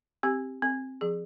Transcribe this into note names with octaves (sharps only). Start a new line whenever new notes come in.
C4 G4
C4
F3 G#4